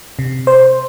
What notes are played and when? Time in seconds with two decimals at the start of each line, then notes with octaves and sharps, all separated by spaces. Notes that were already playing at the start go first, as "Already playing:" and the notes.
0.19 C3
0.47 C5